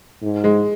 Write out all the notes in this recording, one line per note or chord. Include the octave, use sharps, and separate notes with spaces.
G#2
G#3